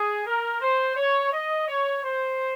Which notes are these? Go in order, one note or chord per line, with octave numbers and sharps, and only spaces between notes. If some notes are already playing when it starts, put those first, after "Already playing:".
Already playing: G#4
A#4
C5
C#5
D#5
C#5
C5